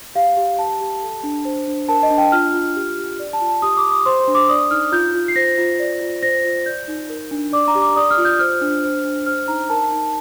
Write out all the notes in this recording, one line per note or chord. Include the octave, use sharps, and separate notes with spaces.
G4 F5
G4
G4 A5
G4
A4
D4
C5
D4
A#4 A5
D#5
D4
G5
F4 F6
F4
G4
G4
D5
A5
F4
A5
G4 D#6
D6
G4
D#6
C5 C6
C6
D4
D6
D5 D#6
D#4 F6
F4 G6
F4
C7
C5 A#6
F4
D5
F4
C5 A#6
F4
D5 G6
D#4
A#4
D4
D5 D6
A#5
G4
D6
D5 D#6
F6
F4
G6
C5 F6
D4
C5
D4
C5 F6
D#4 A#5
A#4 A5
D#4